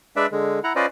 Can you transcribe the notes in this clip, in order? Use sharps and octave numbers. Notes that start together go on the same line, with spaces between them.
G#3 D4 B4 D5 E5
D3 G#3
E4 F#5 A#5
C#4 F4 B4 C5 D5 D#5